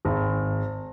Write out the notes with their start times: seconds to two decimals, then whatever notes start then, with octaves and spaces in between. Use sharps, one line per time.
0.05 G#1